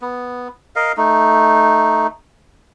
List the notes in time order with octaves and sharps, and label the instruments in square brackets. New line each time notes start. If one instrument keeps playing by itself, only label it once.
[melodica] B3
A#4 D#5 F5
A3 D#4